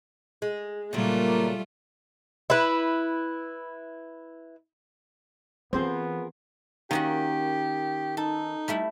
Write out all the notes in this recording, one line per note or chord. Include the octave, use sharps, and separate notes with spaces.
G#3
A#2 C#3 F#3 G3 A3 A#3 F4
E4 B4
E3 B3 C4 F4 G#4 A#4 C5
D#3 A#3 C#4 F#4 G4
D#4 A4
G3 A3 E4